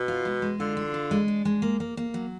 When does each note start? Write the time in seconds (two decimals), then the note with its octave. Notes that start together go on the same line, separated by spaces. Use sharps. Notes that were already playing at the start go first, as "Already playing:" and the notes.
Already playing: B2
0.08 F4
0.25 G#3
0.42 G#3
0.60 D3 F4
0.77 F4
0.94 D4
1.11 G#3
1.28 D4
1.45 G#3
1.62 A#3
1.80 A#3
1.97 A#3
2.14 F#3